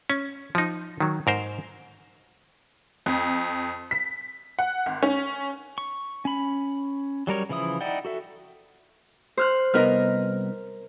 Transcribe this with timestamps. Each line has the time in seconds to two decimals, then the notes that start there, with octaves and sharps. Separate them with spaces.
0.10 C#4
0.55 F3 D#4
1.00 D#3 F#3
1.27 G#2 A#4 C5
3.06 F2
3.91 B6
4.59 F#5
4.86 G#1
5.03 C#4
5.78 C#6
6.25 C#4 B5
7.27 F#3 G3 A#4 C#5
7.49 C#3 E3 F3 E4 D#6
7.81 D#4 E4 D5 F#5 G5
8.05 F#4 A4 E5
9.37 C5 F6 F#6
9.74 C2 B3 D#4 A#4 F6